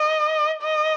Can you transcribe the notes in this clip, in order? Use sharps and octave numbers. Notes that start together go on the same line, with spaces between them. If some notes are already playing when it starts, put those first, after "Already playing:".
Already playing: D#5
D#5